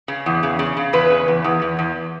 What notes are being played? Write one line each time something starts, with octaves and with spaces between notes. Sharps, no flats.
C#3
E2
C#3
C#3
C#3
E2 B4
C#3
E2
E2
E2
E2